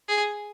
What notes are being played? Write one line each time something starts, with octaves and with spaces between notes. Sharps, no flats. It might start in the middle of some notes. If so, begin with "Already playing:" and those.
G#4